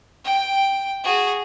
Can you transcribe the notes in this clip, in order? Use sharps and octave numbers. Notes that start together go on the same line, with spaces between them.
G5
F#4 G#4